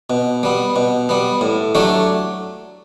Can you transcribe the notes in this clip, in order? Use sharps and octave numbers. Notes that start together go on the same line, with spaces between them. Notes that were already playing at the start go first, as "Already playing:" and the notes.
B2
G3 B3
B2
G3 B3
A2
F#3 A3 D4 G4